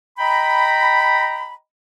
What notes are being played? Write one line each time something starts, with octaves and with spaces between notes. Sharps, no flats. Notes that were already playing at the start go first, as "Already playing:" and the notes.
D#5 G5 A#5 B5